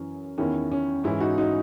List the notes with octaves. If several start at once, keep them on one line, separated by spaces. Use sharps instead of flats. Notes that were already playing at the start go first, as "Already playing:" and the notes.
Already playing: F#2 E3 C#4
E2 D#3 C#4 E4
C#4
G#2 E3 C#4 E4
D#4 F#4
D#4 F#4